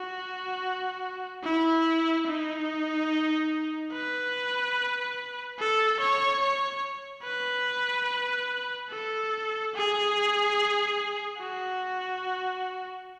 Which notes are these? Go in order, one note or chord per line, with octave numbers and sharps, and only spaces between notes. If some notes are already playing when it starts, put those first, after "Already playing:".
Already playing: F#4
E4
D#4
B4
A4
C#5
C#5
B4
A4
G#4
F#4